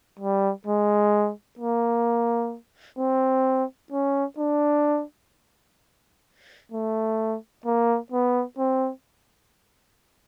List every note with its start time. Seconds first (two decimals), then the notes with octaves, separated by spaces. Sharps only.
0.20 G3
0.67 G#3
1.59 A#3
2.99 C4
3.92 C#4
4.38 D4
6.72 A3
7.66 A#3
8.12 B3
8.58 C4